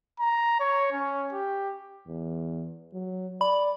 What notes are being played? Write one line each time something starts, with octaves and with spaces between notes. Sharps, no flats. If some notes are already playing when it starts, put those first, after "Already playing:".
A#5
C#5
C#4
G4
E2
F#3
D5 B5